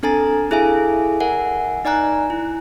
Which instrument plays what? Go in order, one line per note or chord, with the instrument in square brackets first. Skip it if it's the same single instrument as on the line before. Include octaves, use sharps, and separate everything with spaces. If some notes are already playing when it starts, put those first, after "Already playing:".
[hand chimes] C4 D4 A4 G#5 A#5 A6
E4 G#4 A4 E5 F5 G#5
A#4 E5 F#5 G#5
D#4 D5 G#5 A#5 F#6
E4